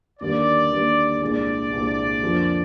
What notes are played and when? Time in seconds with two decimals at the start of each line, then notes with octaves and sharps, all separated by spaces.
0.20 D#2 D3 G3 A#3 D5
0.71 D#2 D3 G3 A#3
1.21 C2 A#2 G#3 D4 G#4 D5
1.72 C2 A#2 G#3 D4 G#4
2.23 F2 D3 F3 A#3 F4